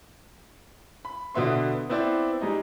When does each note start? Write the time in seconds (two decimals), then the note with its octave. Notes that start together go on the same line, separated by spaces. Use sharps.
1.05 B5
1.35 B2 D3 B3 E5 C6
1.89 B3 C4 E4 C5 D5
2.41 G3 G#3 D#4